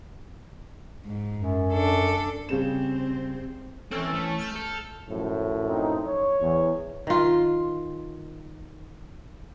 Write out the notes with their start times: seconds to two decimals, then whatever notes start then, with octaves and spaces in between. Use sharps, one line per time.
1.06 G#2
1.35 F#2
1.73 D4 A4
2.49 C#3 G3 C4 E7
3.91 E3 C4 C#4 A4
4.14 A3
4.38 E6 F6 G6
4.56 A4
5.10 F#2 A2 F3
5.68 C4 D#4
6.07 C#5
6.41 E2
7.07 D#3 F4